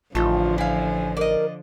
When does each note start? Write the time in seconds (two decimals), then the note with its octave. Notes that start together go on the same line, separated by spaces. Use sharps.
0.15 A1 D3 F3 A3 D#4 F4
0.58 E4 F5 G#5
1.17 A#4 D5 D#5